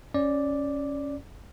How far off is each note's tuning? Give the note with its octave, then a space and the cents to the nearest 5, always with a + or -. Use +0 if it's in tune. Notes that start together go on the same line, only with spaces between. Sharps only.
C#4 +0 D5 +0